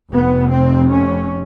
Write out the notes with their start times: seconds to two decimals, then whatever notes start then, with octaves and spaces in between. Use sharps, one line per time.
0.12 F1 F2 C3 B3
0.50 C4
0.89 C#4